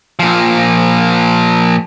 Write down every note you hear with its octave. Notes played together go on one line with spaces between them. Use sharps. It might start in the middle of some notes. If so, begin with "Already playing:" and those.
A#2 F3